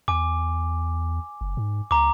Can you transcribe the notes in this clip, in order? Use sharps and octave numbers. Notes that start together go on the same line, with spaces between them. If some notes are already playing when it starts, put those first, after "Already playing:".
E2 G#5 D6
F#1
G#2
C#2 A#5 D6